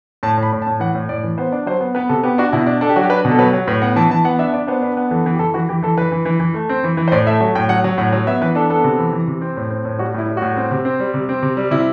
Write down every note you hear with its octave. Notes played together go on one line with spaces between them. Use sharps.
A2 A5
A2 A5
B5
A2
A5
A2
E3 F#5
A2
A2 D5
E3
B3 C5
D4
F#3 C5
B3
B3 B4
C3 A4
B3 G4
D4 F#4
B2 E4
D4
D4 A4
G4
F#3 F#4
G4
D4 B4
B2
A4
F#3 B4
F#3
A2 B4
B3 F#5
E3 A5
E3 A5
B3 F#5
D4 E5
D4 D5
B3 C5
D4 B4
B3
E3 A4
E3
G4
E3 A4
E3 F#4
E3 G4
E3 A4
E3 B4
E3
E3
E3
A3
C4
E3
E3
C5
A2 D5
A3 E5
F#3
A2 G5
F#3 F#5
F#3
A2 F#5
F#3
B3 E5
E3 B4
D4 A4
B3 A4
C3
E3
E3
C3
C4
A2
C4
A2
G3 F#4
A2 E4
G3
A2 F#4
C4
C3
C4
G3
C3
C4
C3
G3
C3 E4